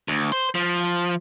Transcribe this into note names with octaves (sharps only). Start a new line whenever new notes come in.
D2
C5
F3